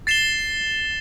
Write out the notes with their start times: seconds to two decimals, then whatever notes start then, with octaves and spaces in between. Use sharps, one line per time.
0.07 A6 C7 E7 G7